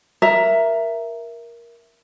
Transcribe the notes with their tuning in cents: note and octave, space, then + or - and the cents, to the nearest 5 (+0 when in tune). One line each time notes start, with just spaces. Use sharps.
A#4 +10 E5 +10 A#5 +0